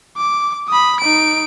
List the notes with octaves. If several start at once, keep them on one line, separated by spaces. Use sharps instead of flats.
D6
B5 D#6
D#4 D7